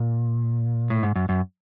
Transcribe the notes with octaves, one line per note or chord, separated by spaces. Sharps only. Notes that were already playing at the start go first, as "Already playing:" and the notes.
Already playing: A#2
A2
G#2
F#2
F#2